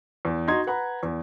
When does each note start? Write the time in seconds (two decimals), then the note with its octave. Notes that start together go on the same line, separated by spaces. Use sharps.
0.25 E2
0.48 D#4 F#4 C6 G#6
0.67 B4 F#5 A#5 B5
1.03 E2